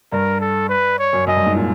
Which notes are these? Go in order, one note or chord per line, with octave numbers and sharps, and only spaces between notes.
G2 A#4
A4
B4
C#5
F#2
F#2 D#5
G2
G#2
A#2